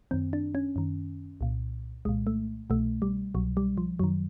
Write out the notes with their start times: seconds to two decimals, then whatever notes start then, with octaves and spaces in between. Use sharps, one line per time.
0.11 F#2 D#3 C4
0.33 D4
0.55 C#4
0.76 F#2 D#3
1.41 C2 A#2
2.05 C2 A#2 G#3
2.27 A3
2.70 C2 B2 A3
3.02 G3
3.34 C2 B2 F#3
3.57 G3
3.78 F3
3.99 F#2 D#3 F#3